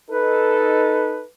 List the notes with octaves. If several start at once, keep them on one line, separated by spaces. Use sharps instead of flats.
D#4 A4 B4